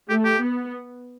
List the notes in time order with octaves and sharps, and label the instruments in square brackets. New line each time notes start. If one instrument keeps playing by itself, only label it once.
[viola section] A3 [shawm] G4
[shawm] G4
[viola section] B3